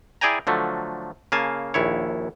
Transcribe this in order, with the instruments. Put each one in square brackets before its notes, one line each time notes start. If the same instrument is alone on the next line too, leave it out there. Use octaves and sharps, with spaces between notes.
[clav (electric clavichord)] E4 G#4 D5 G5 G#5 A#5
D3 F3 F#3 A3
C#3 A#3 F5 G#5 A5
A#1 D#2 E4 C#5